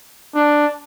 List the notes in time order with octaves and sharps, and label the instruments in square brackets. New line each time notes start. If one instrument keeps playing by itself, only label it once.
[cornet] D4